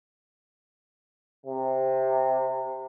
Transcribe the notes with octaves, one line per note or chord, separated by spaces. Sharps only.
C3